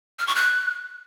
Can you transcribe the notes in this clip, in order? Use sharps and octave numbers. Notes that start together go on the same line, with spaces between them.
F6
C#6
F#6